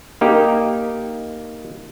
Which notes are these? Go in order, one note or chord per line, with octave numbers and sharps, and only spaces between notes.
A#3 D#4 G4